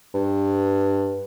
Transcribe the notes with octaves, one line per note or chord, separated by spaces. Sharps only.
G2